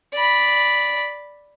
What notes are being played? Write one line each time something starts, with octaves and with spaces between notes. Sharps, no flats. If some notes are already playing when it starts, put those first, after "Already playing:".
D5 B5